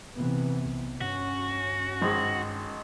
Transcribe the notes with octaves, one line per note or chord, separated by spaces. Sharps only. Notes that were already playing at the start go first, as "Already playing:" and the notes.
C3 E3 B3
B1
G2 C#4 F#4
G#1 G#3